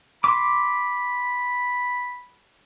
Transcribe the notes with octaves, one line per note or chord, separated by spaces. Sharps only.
B5 C6 D6